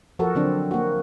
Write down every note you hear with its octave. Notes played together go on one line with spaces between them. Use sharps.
F3 F#4 A4 A#4
D3 F#3 C4 D4
A#3 F#4